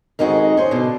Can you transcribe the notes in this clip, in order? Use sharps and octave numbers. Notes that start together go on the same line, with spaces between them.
F2 D#3 G#3 D#4 F#4
C#4 C5
B2 D3